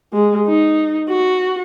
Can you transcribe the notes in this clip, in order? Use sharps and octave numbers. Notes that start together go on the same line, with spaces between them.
G#3
D#4
F#4